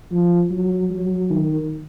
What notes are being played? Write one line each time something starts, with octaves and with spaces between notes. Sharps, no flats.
F3
F#3
F#3
D#3